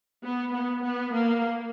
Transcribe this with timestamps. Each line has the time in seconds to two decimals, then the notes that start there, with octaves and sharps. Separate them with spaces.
0.23 B3
0.53 B3
0.83 B3
1.13 A#3